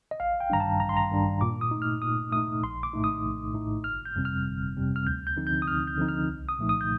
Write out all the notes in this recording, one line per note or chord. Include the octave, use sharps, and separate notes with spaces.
D#5
A1 F5
G5
G2 D#3 G3 D4 A#5
A5
A1 A#5
C6
A#5
G2 D#3 G3 D4
A#2 D6
D#6
A3 D#4
F6
A#2 D#6
A3 D#4 D#6
A#1 C6
D6
A2 A3 D#4
D#6
A#1
A2 A3 D#4
G1 F6
G6
F2 C3 G3 C4
F6
G1
F2 C3 G3 C4
F6
D2 G6
G6
D3 F3 C4 D#4
G6
D#6
D2 F6
G6
D3 F3 C4 D#4
F6
C2
D#6
A#2 F3 A3 D#4
D#6
G6